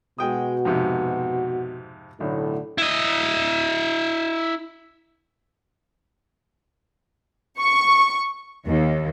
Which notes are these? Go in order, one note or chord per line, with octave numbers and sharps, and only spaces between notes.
B2 G#3 F#4 G5 D#6
F2 G#2 C3
B1 A2 D3
E4 D#5
C#6
D#2